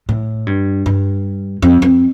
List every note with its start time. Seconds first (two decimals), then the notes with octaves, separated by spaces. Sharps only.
0.09 A2
0.47 G2
0.86 G2
1.62 F2
1.82 F2